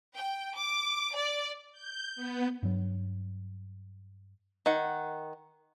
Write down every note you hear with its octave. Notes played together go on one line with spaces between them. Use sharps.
G5
D6
D5
G6
B3
G2 F#3
D#3 F#5